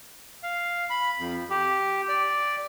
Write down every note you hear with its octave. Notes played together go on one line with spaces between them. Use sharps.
F5
B5
F2
G4
D5